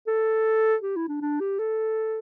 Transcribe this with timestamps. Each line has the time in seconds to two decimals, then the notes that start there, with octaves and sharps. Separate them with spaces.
0.07 A4
0.82 G4
0.96 E4
1.08 D4
1.21 D4
1.40 G4
1.59 A4